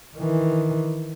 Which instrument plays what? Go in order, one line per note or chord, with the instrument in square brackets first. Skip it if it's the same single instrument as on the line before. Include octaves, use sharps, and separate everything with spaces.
[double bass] D#3 E3